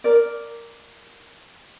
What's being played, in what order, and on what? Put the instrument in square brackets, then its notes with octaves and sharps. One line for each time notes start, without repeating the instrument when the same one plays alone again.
[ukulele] A#4 D5